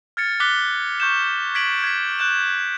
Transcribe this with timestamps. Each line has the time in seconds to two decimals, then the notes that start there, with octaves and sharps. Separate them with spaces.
0.17 F6 G#6 A6 C#7
0.40 D6 F#6 B6 G7
1.00 C#6 G6 E7
1.55 G#6 B6 D7 F#7
1.84 G#6 B6
2.19 F#6 G6 E7